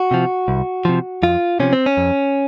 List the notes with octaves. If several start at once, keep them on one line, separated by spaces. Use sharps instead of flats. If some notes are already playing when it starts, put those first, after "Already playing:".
Already playing: F#4
C3 F3
C2
C3 F3
F2 F4
C3 F3 C#4
C4
C#4
F2